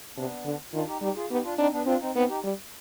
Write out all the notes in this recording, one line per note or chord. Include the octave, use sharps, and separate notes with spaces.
C3 B3 D4
D3
D#3 D4 F4
D#4 G4
G3 D#4 G4
F4 G#4
B3 D#4 G4
D4 F4
C4 D4 D#4
B3 D4
C4 D4 F4
C4 D#4
B3 C4 D#4
D#4 G4
G3